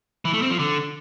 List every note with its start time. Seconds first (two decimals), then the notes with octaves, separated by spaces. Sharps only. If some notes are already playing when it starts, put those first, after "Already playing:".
0.25 E3
0.33 A3
0.42 C4
0.50 F3
0.59 D3